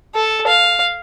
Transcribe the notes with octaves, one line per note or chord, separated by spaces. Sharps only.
A4
F5